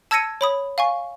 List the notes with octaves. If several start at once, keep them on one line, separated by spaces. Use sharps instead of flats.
A5 E6 G#6 A#6 C#7 D#7
C#5 B5 D#6
F5 G#5 C#6